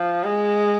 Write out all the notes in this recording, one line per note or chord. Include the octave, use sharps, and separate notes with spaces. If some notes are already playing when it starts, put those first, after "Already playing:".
Already playing: F3
G#3